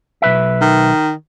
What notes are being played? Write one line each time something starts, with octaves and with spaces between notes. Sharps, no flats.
B1 B4 E5
D#3